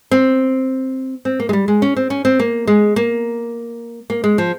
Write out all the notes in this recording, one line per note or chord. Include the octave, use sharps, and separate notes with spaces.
C4
C4
A#3
G#3
G3
G#3
C#4
C4
C#4
C4
A#3
G#3
A#3
A#3
G#3
F3